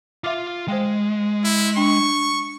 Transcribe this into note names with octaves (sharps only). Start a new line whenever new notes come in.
F4 E5 F5 D6
G#3 C5 F5 G5
E4
D4 G5 C#6